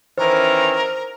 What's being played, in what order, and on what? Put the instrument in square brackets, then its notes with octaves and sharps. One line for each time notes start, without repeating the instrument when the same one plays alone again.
[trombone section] D#3 E3 C#4 [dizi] A#4 [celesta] C5